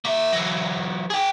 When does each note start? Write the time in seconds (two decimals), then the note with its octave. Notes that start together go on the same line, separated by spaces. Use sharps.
0.05 A#3 E5
0.32 E3 F#3
1.10 G#4 G5